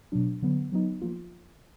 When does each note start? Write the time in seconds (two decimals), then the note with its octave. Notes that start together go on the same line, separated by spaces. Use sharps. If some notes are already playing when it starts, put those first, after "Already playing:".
0.12 B2 F#3 D4
0.42 D3 F#3 B3
0.72 F#3 B3 D#4
1.02 F3 A#3 F4